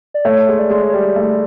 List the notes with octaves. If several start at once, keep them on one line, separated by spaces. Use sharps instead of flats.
D5
A3 C#5
G#3
D5
G#3
C#5
G3 D5
A3